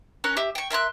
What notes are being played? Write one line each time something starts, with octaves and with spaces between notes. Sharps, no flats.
C#4 A#4 C#5 F#6
G4 E5
G5 C#6
A#4 E5 C6 F#6